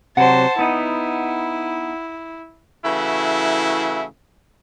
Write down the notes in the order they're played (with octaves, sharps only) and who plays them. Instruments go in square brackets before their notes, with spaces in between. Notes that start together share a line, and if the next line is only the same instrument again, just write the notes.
[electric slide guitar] C3 F#3 [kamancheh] C5 A5 [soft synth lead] F#5
[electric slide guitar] B3 D#4 [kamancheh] E4
[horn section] C#3 E3 A3 E4 F#4